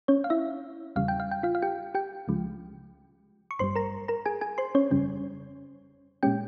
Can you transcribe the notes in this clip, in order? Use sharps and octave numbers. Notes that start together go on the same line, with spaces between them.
C#4 C#5
F5
E4 E5
E2 C#3 G3 F5
G5
F5
G5
F4 F5
F5
G4 G5
G4 G5
C#2 C#3 F3 G#3
C#6
G#1 G2 G3 C5 C6
A#4 A#5
A#4 A#5
G#4 G#5
G#4 G#5
C5 C6
C#4 C#5
G1 F2 C#3 G3 C#4
A#2 G#3 C#4 G4 G5